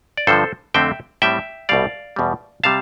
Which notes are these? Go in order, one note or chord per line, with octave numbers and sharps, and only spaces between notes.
D5
G2 D3 F3 A4 C5
F2 D3 A3 C4 E5 G5
A2 G3 C4 E5 G5
C2 B2 G3 D5 F5
E2 B2 G3
C3 G3 F5 A5